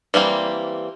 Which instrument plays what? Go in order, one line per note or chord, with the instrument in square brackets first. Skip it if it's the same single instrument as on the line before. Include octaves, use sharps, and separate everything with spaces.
[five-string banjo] E3 G3 A#3 C4